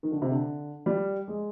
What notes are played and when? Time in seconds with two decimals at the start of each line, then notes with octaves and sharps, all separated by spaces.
0.03 D#3
0.12 D3
0.22 C3
0.31 D3
0.86 G3
1.28 G#3